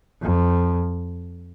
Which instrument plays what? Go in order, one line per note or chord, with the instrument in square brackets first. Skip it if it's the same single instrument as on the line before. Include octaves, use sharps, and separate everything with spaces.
[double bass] F2